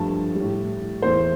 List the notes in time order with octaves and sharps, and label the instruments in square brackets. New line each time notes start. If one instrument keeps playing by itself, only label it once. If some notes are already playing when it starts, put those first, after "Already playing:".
Already playing: [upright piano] G2 F3 A3 A5
A2 G3
E2 E3 A3 C5